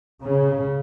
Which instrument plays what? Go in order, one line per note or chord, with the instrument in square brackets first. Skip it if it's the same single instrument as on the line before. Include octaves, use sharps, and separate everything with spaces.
[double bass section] C#3